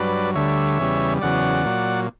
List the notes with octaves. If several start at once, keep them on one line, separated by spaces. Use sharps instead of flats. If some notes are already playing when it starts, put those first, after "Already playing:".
Already playing: G2 F#3 B4 D5
D2 D3 G3 C#5 E5
E2 C#3 G3
E2 C#3 F#3 D5 F#5
A#2 F#3